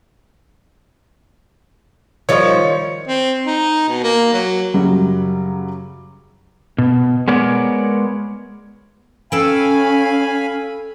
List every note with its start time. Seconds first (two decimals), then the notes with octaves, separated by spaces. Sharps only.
2.29 D#3 F3 G3 C#5 C#6
3.08 C4
3.46 D#4
3.88 B2
4.03 A#3
4.33 F#3
4.74 F#2 C#3 F#3 G3 C#4
6.78 B2
7.28 G#3 B3 A#4 C#5 D5
9.32 C#4 A4 F5 G5 G#5 B5